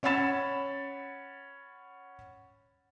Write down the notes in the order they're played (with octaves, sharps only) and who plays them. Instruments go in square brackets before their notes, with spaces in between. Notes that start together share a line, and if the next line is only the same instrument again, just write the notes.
[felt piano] C#4 C#5 F#5 B5 A6 E7